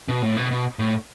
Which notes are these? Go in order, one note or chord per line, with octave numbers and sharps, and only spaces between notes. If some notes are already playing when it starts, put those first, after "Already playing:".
B2
A2
B2
B2
A2